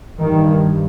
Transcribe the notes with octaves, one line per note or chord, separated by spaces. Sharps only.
G2 D#3